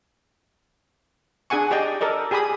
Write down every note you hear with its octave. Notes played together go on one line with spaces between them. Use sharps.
D4 G#4 F#5 G#5 C#6
G4 D5 D#5 G5
A4 A#4 D5 D#5
G4 G#4 G#5 B5 D#6